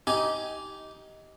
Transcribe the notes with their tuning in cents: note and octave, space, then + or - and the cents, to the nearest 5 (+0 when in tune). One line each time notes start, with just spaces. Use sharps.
D#4 +15 G4 -15 G#5 +5